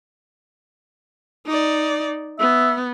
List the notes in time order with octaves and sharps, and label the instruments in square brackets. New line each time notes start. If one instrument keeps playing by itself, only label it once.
[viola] D#4 D5
[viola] B3 [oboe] E5